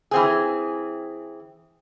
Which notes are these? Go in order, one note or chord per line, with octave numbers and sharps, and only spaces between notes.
E3 C4 G#4